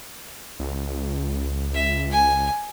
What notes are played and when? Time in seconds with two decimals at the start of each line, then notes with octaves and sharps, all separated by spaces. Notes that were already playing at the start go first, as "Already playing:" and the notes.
0.59 C#2
1.74 E5
2.11 G#5